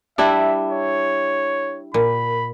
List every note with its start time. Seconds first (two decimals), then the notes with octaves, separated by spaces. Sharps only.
0.18 G3 D4 E4 E5
0.72 C#5
1.94 A#2 B5